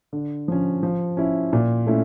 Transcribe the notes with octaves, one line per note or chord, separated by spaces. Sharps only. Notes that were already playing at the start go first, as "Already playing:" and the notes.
D3
F3 C#4
F3
C#4 E4
A#2
A3 C#4 E4